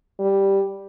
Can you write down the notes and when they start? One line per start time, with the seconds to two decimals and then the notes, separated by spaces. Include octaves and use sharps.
0.19 G3